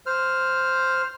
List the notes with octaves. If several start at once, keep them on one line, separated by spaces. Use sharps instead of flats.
C5 F6